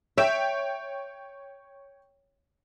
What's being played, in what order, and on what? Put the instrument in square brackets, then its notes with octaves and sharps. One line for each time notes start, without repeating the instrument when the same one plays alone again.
[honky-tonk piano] C#5 G5 [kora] E5